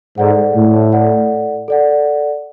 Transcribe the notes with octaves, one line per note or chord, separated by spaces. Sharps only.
G#2 A4 D5 F#5
A2
A4 D5 F#5
A4 D5 F#5